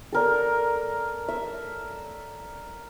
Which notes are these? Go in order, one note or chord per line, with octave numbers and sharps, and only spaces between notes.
A4 A#4 D5
E5